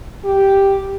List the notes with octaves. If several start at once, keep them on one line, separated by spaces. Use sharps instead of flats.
G4